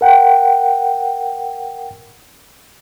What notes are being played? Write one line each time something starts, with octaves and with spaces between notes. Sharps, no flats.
A#4 F#5 G5